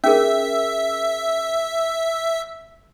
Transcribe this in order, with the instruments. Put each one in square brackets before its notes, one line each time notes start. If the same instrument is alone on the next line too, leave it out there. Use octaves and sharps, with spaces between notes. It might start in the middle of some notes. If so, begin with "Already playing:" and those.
[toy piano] C#4 G#4 A#4 [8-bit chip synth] E5